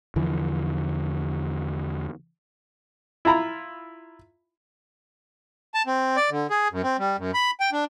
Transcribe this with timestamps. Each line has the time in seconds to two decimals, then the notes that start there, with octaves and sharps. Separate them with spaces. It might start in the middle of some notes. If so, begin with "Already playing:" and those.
0.16 E2 D3 E3 F3
3.25 E4 F4 A#5 B5
5.74 A5
5.87 C4
6.17 D5
6.30 D3
6.50 G#4
6.72 F#2
6.84 C4
6.99 G3
7.18 F#2
7.34 B5
7.60 G5
7.72 D4